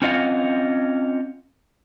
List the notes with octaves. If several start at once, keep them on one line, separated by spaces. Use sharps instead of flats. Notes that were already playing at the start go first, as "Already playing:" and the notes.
C4 C#4 F4 D#5 F5 F#5